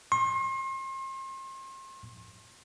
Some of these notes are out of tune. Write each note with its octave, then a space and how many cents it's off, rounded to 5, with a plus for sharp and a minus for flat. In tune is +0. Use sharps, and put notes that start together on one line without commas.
C6 +40